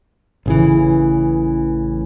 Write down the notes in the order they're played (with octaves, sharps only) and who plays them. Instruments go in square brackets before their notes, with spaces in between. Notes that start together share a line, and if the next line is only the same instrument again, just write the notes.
[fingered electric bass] A1 C#3 E3